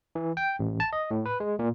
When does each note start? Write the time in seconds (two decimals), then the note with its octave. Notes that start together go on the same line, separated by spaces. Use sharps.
0.15 E3
0.37 G5
0.59 A1
0.80 A5
0.93 D#5
1.11 A2
1.26 B4
1.40 G#3
1.59 A#2